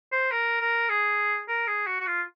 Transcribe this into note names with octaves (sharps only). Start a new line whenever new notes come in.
C5
A#4
A#4
G#4
A#4
G#4
F#4
F#4
F4